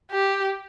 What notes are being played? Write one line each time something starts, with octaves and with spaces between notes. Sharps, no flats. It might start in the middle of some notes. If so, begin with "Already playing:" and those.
G4